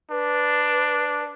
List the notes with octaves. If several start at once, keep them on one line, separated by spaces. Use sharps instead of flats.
D4 B4